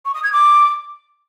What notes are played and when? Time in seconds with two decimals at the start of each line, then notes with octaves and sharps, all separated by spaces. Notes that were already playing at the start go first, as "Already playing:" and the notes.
0.05 C#6
0.14 D#6
0.24 G#6
0.33 D6